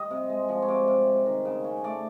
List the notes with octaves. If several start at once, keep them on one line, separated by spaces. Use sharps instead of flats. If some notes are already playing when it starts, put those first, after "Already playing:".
Already playing: G3 D#5
C3
G#3
F3
C#5
C3 D5
C3
G3
D#3
C#3
C#4
A3 D5